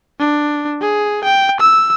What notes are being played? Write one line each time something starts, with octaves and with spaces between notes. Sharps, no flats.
D4
G#4
G5
E6